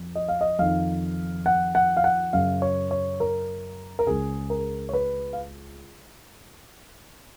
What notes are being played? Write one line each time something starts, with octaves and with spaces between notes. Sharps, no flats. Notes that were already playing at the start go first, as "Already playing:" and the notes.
Already playing: F2
D#5
F5
D#5
F2 D#3 F5
F#5
F#5
F5
F#5
F#2 C#3 F5
C#5
C#5
A#4
A#4
C#2 C#3 G#4
A#4
C#5
B4
F5